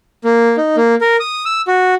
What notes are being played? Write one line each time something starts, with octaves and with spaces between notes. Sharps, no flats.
A#3
D#4
A#3
A#4
D#6
E6
F#4